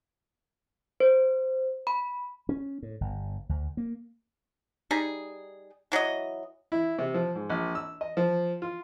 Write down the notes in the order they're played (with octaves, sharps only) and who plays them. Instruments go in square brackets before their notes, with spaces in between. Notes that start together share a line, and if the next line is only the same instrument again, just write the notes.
[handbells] C5
B5
[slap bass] C#4
A2
G1
D2
A#3
[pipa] G3 D#4 G#4
E3 F#3 F#4 D#5
[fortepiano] E4
C3
F3
G#2
A#1
E6
D#5
F3
F4